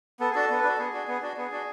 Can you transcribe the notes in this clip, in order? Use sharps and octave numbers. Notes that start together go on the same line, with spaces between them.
B3 A4
G#4
D4 F#4 A4
B3
B4
D4 F#4 A4
B3 G#4
D4 F#4
B3
D4 F#4
B3 G#4
D4 F#4